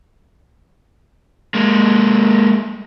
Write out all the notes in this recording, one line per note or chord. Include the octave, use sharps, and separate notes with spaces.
G#3 A#3